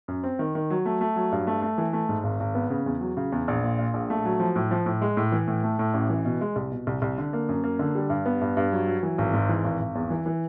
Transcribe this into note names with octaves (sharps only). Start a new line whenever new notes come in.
F#2
C4
D#3
D#3
F#3
A3
A3
F#3
G2
A3
A3
E3
A3
G#2
G#1
G#1
B3
C#3
E2
F#3
C#3
E2
A#1
A#2
A#2
A#1
A3
F#3
F3
A2
F3
A2
G#3
A2
E3
A2
A3
A2
A1
E3
B2
G#3
C2
B2
C2
C2
D3
A#3
F#2
A#3
D3
G3
G2
B3
G2
G2
F#3
F#3
E3
G#1
G#2
E3
G#1
G#1
E2
E3
E3